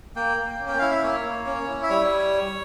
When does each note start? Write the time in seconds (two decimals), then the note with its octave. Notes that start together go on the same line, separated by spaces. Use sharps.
0.16 A#3 G5
0.37 A#3
0.59 C#4
0.67 G5
0.79 E4 F5
0.91 E5
1.03 A#3 C#5
1.25 A#3
1.47 C#4
1.68 E4
1.83 E5
1.89 G3 C#5